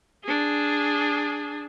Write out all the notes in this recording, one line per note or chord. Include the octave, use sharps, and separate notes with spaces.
D4 G#4